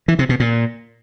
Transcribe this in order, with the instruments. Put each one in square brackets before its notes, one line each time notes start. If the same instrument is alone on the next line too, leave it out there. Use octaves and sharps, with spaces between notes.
[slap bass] E3
C3
B2
A#2